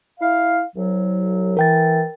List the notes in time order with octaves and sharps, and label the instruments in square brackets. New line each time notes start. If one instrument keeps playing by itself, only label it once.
[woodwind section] E4 F5
C2 F#3
[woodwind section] E3 [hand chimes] A#4 G5 A6